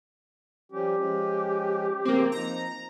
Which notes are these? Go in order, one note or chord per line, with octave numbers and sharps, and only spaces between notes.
F3 G3 C#4 G4
F3 G#3 C#4
C#3 F3 A#3 C4
F3 D#4 A#5